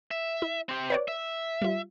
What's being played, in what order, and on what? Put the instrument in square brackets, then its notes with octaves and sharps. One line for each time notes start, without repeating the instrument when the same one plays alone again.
[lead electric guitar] E5
[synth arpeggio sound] E4
[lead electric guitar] C4 G4
[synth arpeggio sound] B4 C#5 D5
[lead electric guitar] E5
[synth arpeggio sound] G3 F4